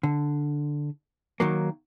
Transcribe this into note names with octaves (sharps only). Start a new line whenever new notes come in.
D3
D#3 F#3 A#3